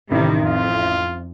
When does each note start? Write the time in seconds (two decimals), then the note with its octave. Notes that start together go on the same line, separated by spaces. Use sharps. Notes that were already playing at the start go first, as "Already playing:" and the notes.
0.11 A1 C3 D#3 G3
0.45 F2 F4